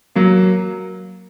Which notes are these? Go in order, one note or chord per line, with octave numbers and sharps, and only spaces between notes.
F#3 A#3